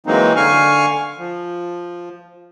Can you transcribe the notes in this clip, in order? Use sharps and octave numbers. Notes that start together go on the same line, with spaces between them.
E3 F#3 G#3 A#3 C4 D#4
D3 F5 G#5 C#6 F6
F3